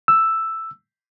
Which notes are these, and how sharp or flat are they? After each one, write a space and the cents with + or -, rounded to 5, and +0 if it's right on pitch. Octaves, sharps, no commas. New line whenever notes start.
E6 +5